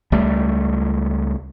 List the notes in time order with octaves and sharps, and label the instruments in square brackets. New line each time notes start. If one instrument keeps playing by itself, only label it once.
[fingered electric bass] C#2 G3 A3